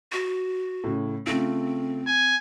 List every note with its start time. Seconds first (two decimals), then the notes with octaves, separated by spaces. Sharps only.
0.12 F#4
0.84 A2 C#3
1.27 C#3 A3 C4 F4
2.07 G#5